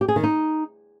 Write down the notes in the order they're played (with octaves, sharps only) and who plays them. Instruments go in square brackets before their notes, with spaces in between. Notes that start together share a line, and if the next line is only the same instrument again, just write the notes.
[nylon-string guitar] G4
G#4
D#3
D#4